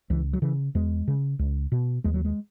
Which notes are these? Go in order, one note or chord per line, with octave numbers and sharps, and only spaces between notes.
C#2 E3
F#3
C#3 E3
E2 G#3
C#3
C#2
B2
D#2 G#3
F#3
G#3